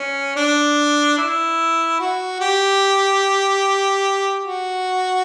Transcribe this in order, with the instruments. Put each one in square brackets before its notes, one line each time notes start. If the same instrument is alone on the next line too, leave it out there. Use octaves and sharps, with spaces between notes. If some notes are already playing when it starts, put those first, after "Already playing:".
Already playing: [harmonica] C#4
D4
E4
F#4
G4
F#4